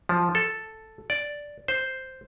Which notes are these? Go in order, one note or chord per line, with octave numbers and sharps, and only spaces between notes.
F3
A4
D5
C5